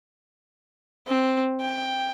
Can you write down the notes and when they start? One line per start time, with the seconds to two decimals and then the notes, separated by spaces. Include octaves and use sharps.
1.07 C4
1.61 G5